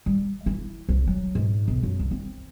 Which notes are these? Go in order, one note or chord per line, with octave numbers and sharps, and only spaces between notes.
G3
E4
C2
F#3
G#2
B1
F#2
C2
C4